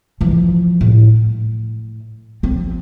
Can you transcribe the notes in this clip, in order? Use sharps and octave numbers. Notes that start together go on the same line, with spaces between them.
E3 F3
A2
F3 C4